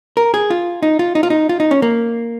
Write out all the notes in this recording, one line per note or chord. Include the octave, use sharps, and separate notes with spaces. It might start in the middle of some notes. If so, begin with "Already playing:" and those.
A#4
G#4
F4
D#4
F4
D#4
F4
D#4
F4
D#4
C#4
A#3